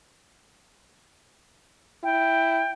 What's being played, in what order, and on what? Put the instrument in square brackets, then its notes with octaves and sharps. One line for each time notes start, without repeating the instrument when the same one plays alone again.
[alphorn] E4 [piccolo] G5